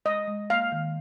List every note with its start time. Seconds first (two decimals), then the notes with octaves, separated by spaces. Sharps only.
0.05 G#3 D#5
0.27 G#3
0.50 A#3 F5
0.72 D#3